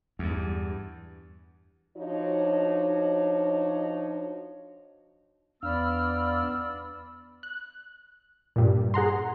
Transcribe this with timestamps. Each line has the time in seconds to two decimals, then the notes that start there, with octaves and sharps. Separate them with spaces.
0.19 E2 G2
1.97 F3 D4 D#4 F#4 C#5
5.63 E2 B3 D4 D5 F5 B5 E6 F6
7.43 F#6
8.56 G2 A#2
8.94 G#4 F#5 A#5 C6